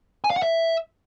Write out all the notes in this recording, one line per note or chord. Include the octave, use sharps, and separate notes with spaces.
G#5
F5
F#5
E5